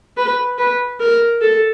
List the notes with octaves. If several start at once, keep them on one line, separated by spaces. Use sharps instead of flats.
B4
B4
A#4
A4